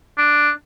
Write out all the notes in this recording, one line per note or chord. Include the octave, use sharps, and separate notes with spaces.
D4